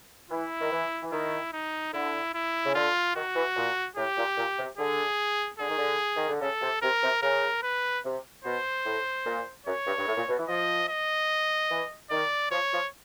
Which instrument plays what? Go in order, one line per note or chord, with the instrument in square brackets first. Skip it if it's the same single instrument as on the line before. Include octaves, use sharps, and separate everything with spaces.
[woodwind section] E3 [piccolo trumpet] E4
[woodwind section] D#3
E3
E3
[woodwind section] D#3 [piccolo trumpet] E4
[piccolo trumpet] D#4
[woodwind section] D3 [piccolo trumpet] E4
[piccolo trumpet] E4
[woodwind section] C#3
[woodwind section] D3 [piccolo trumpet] F4
[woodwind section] D#3 [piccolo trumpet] F#4
[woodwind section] E3
A#2
[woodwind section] A2 [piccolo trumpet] G4
[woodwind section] A#2
A#2
C3
[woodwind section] D3 [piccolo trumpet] G#4
[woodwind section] D3 [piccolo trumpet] G#4
[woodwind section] D#3
D3
D#3
D3
[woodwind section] C#3 [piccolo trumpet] A4
[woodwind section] C3
[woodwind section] C3 [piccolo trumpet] A#4
[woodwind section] C3
[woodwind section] C#3 [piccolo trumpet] A#4
[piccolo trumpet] B4
[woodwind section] C3
[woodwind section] B2 [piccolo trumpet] C5
[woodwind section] A2
A#2
[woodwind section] F#2 [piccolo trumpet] C#5
[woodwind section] G2
G2
A2
A#2
B2
E3
[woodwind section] F3 [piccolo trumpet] D#5
[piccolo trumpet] D#5
[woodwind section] E3
[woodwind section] D#3 [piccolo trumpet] D5
[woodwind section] F3 [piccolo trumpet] C#5
[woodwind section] F3